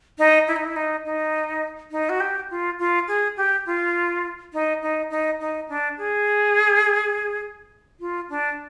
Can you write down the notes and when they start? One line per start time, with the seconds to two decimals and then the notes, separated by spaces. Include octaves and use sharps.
0.19 D#4
0.48 E4
0.56 D#4
0.65 E4
0.76 D#4
1.05 D#4
1.91 D#4
2.09 F#4
2.20 G4
2.50 F4
2.79 F4
3.08 G#4
3.37 G4
3.66 F4
4.53 D#4
4.82 D#4
5.10 D#4
5.40 D#4
5.69 D4
5.98 G#4
8.00 F4
8.30 D4